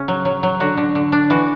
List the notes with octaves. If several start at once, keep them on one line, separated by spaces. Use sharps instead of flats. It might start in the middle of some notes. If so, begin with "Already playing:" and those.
Already playing: C#3 C#4
F#3
F#3
F#3
D3 F#4
D3
D3
D4
E3 F#4